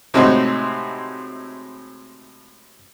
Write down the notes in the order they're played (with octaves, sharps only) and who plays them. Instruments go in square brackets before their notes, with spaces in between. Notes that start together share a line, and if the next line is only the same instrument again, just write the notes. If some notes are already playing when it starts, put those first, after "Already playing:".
[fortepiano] A2 C3 G#3 C4 D#4 F#4